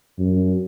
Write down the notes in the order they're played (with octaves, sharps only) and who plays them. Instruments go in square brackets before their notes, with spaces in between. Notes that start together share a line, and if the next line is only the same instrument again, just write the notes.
[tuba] F#2